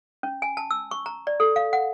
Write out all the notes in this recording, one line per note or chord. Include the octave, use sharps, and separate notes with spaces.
C#4
G#5
A5
E6
C#6
A#5
D5
A4
F5
F#5